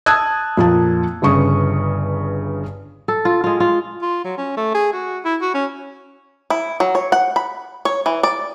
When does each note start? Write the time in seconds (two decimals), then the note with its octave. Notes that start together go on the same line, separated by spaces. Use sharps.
0.06 A5 D#6 E6 F#6 G#6
0.57 F2 A#2 A#3 A5
1.22 G1 G2 C#3 C#6 D#6
3.08 A4
3.25 F4
3.44 G#3 F4
3.60 F4
4.02 F4
4.24 F#3
4.38 C#4
4.57 A3
4.74 G#4
4.93 F#4
5.25 E4
5.41 F#4
5.54 C#4
6.50 E4
6.80 F#3
6.95 C#5
7.12 F#5
7.36 B5
7.85 C#5
8.06 E3
8.23 D5